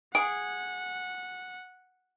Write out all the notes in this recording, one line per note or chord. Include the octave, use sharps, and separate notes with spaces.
G#4 F#5 D7